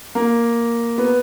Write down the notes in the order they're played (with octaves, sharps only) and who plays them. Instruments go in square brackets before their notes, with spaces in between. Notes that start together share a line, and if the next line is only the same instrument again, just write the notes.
[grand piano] A#3
B3